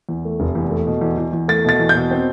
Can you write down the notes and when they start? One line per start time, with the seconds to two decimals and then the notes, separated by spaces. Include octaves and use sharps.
0.09 E2
0.25 A3
0.40 F1
0.55 E2
0.71 A3
0.87 B2
1.01 E2
1.18 E2
1.33 E2
1.48 A3 A6
1.65 B2 A6
1.80 E2
1.89 G6
1.95 B2
2.11 C4